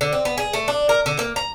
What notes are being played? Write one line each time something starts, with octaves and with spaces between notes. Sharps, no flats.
D3
C4
B3
G#4
A3
D4
A#4
D3
A#3
A#5